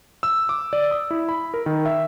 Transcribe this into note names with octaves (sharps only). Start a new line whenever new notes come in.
E6
D6
D5
D#6
E4
B5
A#4
D#3
E5